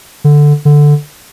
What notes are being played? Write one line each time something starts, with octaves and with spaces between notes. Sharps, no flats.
D3
D3